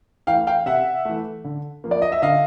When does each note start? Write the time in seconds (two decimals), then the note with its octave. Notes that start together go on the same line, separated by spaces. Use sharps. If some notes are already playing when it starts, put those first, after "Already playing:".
0.27 E3 F5 G5
0.31 A3
0.47 F5 G5
0.66 C3 E5 F#5
1.05 E3 A3
1.44 D3
1.84 F3 A#3
1.91 D5
2.02 D#5
2.12 E5
2.22 D3 D#5 F5